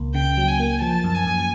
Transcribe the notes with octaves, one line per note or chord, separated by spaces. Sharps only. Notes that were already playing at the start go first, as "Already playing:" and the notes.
Already playing: C#2 A#3
C#3 G5
F#3
G#5
A#3
F3 A5
F#2
G#5
F#2